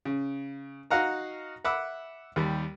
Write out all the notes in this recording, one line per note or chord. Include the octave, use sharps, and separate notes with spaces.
C#3
D#4 F#4 D#5 F5 F#5 A#5
E5 F#5 B5 D6 E6
D#2 G3